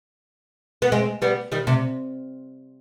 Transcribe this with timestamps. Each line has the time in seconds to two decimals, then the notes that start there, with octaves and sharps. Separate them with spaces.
0.82 B3
0.92 G#3 C4
1.22 G3 B3
1.52 D#3 G3
1.67 C3